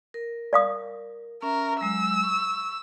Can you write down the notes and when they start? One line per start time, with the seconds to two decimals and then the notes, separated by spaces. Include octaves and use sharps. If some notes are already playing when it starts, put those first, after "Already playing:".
0.14 A#4
0.53 D5 F5 D#6
1.42 C#4 A#4 E5
1.81 F#3 G#3 E6
2.23 C#6